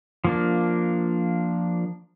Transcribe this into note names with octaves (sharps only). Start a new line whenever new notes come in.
F3 A#3 D4